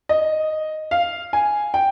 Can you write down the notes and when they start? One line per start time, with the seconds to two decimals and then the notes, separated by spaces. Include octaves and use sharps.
0.09 D#5
0.91 F5
1.33 G#5
1.74 G5